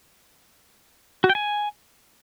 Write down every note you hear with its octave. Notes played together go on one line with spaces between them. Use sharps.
F#4
G5
G#5